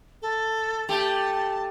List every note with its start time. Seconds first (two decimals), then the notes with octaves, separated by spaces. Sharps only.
0.22 A4
0.89 A3 G4 A5